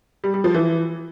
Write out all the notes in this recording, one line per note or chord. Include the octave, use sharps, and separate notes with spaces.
G3
G3
F3
E3